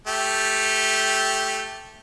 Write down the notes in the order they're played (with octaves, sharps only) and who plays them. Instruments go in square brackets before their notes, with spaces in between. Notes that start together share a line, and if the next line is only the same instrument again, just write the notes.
[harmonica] A3 G4